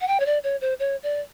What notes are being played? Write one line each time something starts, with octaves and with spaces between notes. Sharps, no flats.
F#5
G5
C#5
D5
C#5
C5
C#5
D5